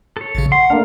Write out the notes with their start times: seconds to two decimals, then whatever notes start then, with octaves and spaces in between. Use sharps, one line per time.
0.17 A4 C#5
0.35 A1 C#3
0.52 F#5 C6
0.70 A3 A#3 D4 F5